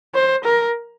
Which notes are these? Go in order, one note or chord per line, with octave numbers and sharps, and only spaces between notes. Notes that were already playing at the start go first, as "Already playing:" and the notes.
C5
A#4